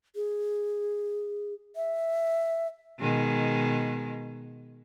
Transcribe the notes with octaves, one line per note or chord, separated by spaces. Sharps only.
G#4
E5
B2 D#3 G#3